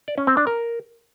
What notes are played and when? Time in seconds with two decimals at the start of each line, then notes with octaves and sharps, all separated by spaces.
0.08 D5
0.18 C#4
0.27 C4
0.37 D4
0.47 A#4